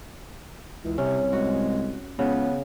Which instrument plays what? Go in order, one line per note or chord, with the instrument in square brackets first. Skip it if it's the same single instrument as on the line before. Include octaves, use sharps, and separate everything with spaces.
[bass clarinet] C#2 [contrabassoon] E3
[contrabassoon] C2 [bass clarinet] C3 [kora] C#4
[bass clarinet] G#3 [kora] F#4
[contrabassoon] C#2 [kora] C#3 [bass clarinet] B3